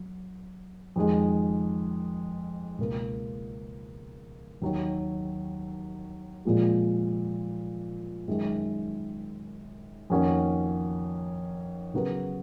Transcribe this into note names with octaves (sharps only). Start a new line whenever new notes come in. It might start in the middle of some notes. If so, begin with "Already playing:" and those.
Already playing: F#3
F2 D#3 G#3
C#2 B2 A#3
D#2 D#3 F#3
A#2 F3 G#3
F#2 D#3 G#3
F2 D#3 A#3 C#4 F#4
C#3 F#3 B3 F#4 A#4